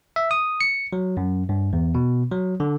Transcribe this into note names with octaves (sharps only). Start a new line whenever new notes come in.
E5
D#6
C#7
F#3
F#2
G2
E2
B2
F#3
D3